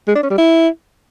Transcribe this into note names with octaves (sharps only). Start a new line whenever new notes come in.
G#3
D4
C#4
G3
E4